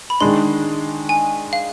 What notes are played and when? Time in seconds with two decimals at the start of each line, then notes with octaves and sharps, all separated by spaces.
0.10 B5
0.20 D#3 G#3 D4 C6
1.09 G#5
1.53 F5